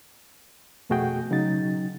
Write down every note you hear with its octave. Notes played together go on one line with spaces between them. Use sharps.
F2 B2 A3 F#4 G#4 G5
C#3 F#3 D#4 A6